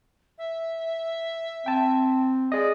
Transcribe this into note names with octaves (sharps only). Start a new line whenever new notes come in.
E5
C4 G5 A5
G#4 D5 D#5